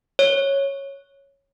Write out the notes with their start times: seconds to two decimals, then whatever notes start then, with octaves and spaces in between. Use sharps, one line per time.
0.19 C#5